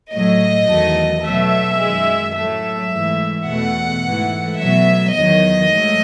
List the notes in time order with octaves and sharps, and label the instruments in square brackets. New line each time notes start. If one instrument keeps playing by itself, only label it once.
[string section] A2 F#3 A3 D#5
E2 D#3 F#3 A3
B2 F#3 A3 E5
F#2 D#3 G#3
A2 F#3 A3 E5
G#2 E3 A3
E2 B2 A3 F#5
G#2 E3 A3
B2 F#3 A3 E5
E2 D#3 F#3 D#5
G#2 F#3 A3